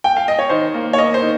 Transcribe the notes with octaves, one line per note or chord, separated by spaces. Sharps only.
G5
F5
D#5
C#5
D#3 C5
A#3
C#5
A#3 D#5
C5
D#3